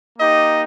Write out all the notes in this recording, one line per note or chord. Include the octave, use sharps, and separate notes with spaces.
A#3 D#4 G4 D#5